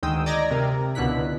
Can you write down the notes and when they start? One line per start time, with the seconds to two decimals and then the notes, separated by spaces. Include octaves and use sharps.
0.03 D2 D#3 G#3 G5 D#6 E6
0.26 D5 D#5 A#5 G#6 A#6
0.51 C3 A#4
0.95 C#2 B2 D3 E4 F#6 B6